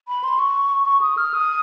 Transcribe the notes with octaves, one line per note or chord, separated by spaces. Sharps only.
B5
C6
C#6
C#6
D#6
F6
D#6